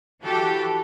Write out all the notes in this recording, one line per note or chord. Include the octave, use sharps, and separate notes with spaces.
E3 F#4 G4 A4